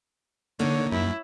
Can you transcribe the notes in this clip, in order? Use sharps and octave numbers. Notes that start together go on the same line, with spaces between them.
D3 A#3 D#4 C#5
F#2 E4